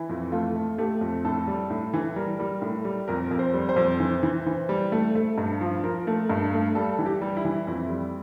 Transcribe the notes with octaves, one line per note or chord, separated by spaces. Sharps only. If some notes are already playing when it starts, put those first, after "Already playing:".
Already playing: E3 E4
F2
A3 F4
A3
A3 G4
F2
A2 A4
G3
A2
E3
G3 A#4
G3
A2
G3
F2 A#4
F2
C5
G3
C5
F2
E3
E3
E3
G3
A3
A3
G2
F3
F3 A#4
A3
G2
A3
G3 A4
E3
G4
G3
E4
E3
F2 E4
G3